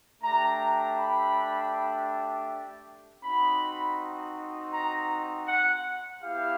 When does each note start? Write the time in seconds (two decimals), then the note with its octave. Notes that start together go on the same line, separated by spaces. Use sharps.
0.20 A3 D4 G4 A#5
0.96 B5
3.21 C4 D#4 F#4 B5
4.72 A#5
5.47 F#5
6.22 B3 E4 G4 F5